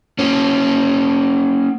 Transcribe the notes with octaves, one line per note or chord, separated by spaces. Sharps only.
A#3 C#4